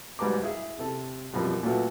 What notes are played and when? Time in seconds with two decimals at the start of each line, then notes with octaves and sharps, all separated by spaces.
0.19 B1 G#2 G3 B4 A#5 D6
0.43 E4 G#4 E5
0.79 C3 A4
1.34 F#2 B2 F3 G3 C4 A#4
1.63 A#2 F#3 A3 B3